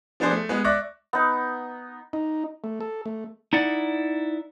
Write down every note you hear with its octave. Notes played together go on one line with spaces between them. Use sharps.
F3 B3 D4 G#4 C5
A3
G#3 B3
D5 E5 C#6 D6 F#6 A#6
B3 D#4
D#4
A3
A4
A3
D#4 E4 D5 F#5